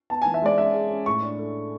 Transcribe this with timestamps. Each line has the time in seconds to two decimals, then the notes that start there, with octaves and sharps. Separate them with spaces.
0.10 B3 A5
0.22 E3 G#5
0.34 E5
0.42 G#3 D5
0.58 C#4 E5
0.74 G#4
0.90 C#4
1.06 A2 C#6
1.22 D4
1.39 A3